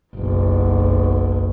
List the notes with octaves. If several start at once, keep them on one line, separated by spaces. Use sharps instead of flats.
F#1 B1